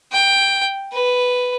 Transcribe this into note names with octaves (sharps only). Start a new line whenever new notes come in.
G5
B4